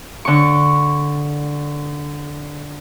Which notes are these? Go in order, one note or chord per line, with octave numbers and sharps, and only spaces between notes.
D3 C#6